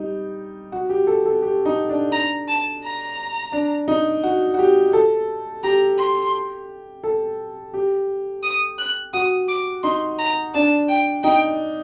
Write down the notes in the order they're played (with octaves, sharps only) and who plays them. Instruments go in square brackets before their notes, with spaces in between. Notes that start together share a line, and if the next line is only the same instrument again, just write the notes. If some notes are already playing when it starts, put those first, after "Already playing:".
Already playing: [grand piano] G3 D#4
F#4
G4
A4
A4
G4
D#4
D4
[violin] A#5
A5
A#5
[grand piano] D4
D#4
F#4
F#4
G4
A4
[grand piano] G4 [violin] A#5
[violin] C6
[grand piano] A4
G4
[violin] D#6
F#6
[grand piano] F#4 [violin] D#6
[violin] D6
[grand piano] D#4 [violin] C6
[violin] A#5
[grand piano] D4 [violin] A5
[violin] G5
[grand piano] D#4 [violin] G5